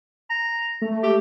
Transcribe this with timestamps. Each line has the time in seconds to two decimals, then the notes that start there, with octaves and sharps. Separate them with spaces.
0.30 A#5
0.82 A3
1.03 G4